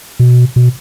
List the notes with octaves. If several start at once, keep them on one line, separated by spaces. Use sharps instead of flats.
B2
B2